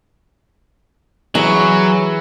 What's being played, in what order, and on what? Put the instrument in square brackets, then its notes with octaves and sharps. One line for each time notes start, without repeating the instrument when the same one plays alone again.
[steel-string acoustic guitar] E3 G#4 [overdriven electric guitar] F#3